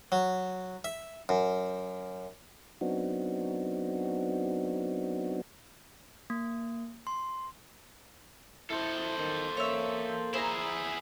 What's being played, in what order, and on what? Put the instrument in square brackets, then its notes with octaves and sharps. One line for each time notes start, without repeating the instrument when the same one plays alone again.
[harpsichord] F#3
E5
F#2
[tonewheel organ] F#3 B3 C4 D4 D#4 F#4
[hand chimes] A#3
C6
[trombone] E4 [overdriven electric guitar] A4 C5
[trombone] D#3
[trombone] A#3 [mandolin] C#5 E5
[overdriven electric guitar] E4 G#4 [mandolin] C5 A#5